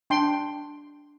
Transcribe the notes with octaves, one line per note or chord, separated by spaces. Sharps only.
D4 G5 C6